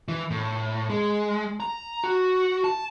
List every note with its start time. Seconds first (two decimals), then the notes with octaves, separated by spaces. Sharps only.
0.08 E3
0.30 A2
0.90 G#3
1.60 A#5
2.04 F#4
2.64 A5